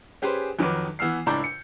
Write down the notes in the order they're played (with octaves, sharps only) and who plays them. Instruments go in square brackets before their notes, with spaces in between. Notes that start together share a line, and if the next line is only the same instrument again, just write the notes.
[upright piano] C#4 G4 G#4 B4 C5
F2 D#3 F#3 B4 D6
E3 B3 E6 F6 C7
C#2 A2 D4 A#5 D6 G6
C#7